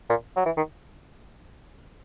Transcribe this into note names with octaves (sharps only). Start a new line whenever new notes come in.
A#2
F#3
E3
D#3